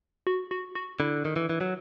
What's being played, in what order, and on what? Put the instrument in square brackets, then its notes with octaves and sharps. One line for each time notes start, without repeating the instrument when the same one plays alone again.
[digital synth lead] F#4
F#4
F#4
[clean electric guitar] D3 [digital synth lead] E4
[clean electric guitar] D#3
E3
E3
F#3